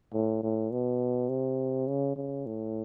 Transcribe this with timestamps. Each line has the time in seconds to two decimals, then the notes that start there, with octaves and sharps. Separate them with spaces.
0.13 A2
0.43 A2
0.72 B2
1.29 C3
1.87 C#3
2.16 C#3
2.46 A2